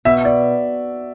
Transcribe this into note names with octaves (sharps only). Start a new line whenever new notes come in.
B2 E5
D5